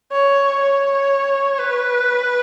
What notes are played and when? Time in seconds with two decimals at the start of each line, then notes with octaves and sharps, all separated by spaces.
0.12 C#5
0.60 C#5
1.58 B4